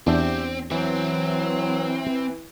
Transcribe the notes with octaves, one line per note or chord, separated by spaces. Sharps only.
E2 C4 D4 G4 E5
E3 F#3 C4